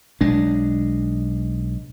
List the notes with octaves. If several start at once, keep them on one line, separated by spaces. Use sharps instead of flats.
B1 G#3 D4